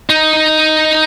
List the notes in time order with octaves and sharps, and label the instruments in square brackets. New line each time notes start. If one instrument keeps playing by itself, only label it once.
[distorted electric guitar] D#4